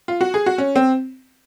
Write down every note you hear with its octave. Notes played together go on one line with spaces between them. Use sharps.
F4
F#4
G#4
F#4
C#4
C4